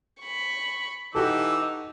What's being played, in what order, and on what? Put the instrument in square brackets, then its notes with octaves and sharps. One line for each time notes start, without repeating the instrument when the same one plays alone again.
[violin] B5 C#6
[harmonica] E3 D6 E6 [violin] D#4 [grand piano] F#4 G4 A4